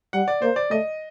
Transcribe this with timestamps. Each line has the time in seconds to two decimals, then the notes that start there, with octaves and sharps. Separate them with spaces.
0.13 G3 F#5
0.28 D5
0.42 A#3 C5
0.56 D5
0.70 A3 D#5